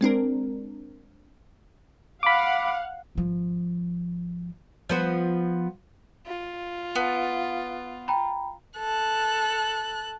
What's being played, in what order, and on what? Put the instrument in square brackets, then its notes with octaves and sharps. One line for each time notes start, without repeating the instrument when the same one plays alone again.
[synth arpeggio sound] G#3 C4 D4 A#4
[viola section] F5 F#5 [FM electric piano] B5 D6
[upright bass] G#1 F3
[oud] F3 B3 C5
[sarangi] F4
[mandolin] B3
[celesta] G5 A#5 B5
[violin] A4 F#6